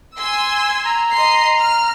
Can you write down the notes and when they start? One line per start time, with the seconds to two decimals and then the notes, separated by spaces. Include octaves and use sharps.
0.16 G#5 C6 E6
0.85 A#5
1.14 D#5 C6 C7
1.60 F6